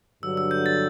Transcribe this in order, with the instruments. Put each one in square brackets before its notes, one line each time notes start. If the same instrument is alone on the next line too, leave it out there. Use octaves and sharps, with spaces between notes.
[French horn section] G2 D3 F#3 [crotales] E6
[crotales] E6
G6
A6